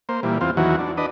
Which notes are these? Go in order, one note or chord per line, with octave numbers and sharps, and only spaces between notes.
A#3 C5
A#2 E3 G3
E2 C4 F4
E2 D#3 E3 F#3 F#4
D4
D4 B4 D#5